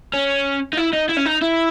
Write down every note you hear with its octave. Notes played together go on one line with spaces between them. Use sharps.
C#4
D#4
E4
D#4
E4
C#4
D#4
E4